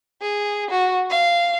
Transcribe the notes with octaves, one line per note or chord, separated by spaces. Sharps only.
G#4
F#4
F5